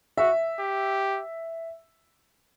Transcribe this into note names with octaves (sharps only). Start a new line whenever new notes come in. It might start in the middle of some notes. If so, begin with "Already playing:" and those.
F#4 E5
G4